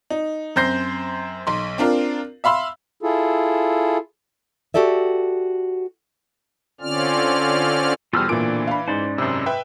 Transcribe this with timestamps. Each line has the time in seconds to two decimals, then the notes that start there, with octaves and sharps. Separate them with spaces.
0.10 D#4
0.56 F#2 C4 C5 G6 A#6 C7
1.47 B1 C6
1.78 C4 D4 F4 A#4
2.44 E5 F5 B5 C6 E6
3.03 E4 F4 G#4 A4
4.74 F#4 G4 A4 D5 E5
6.81 D3 C4 C#4 F4 D5 F6
8.13 E2 B2 D3 G3 C4 F4 E6 F6
8.29 A#2 E3 D4 D5 D7
8.67 F5 B5
8.88 G#2 C#4 C5 D5
9.18 F#2 C3 E4 C5
9.46 B4 E5 G5